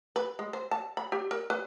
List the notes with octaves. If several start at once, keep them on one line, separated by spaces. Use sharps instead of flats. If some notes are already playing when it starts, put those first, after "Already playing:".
B4
G#3
C5
A5
B5
G4
A#4
B4